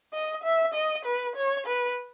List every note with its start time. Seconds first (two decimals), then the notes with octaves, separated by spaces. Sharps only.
0.13 D#5
0.44 E5
0.74 D#5
1.05 B4
1.36 C#5
1.67 B4